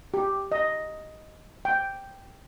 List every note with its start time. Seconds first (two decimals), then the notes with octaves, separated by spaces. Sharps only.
0.14 G4
0.52 D#5
1.65 G5